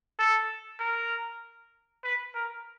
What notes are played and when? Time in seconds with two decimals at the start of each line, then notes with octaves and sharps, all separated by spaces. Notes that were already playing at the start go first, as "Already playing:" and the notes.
0.19 A4
0.80 A#4
2.04 B4
2.34 A#4